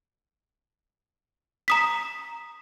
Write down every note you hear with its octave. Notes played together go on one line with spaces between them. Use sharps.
A#5 D#6 B6